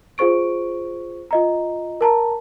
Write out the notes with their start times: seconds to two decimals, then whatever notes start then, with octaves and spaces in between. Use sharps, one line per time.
0.18 F4 G#4 C5 C#6 D7
1.31 F4 D#5 A#5
2.01 A#4 A5 A#5